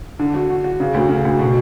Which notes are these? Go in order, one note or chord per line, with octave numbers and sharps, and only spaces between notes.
D3
F#4
F#4
F#4
C#3
D2
C#3
D2
B2